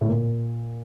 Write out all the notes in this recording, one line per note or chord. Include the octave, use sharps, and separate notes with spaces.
A2
A#2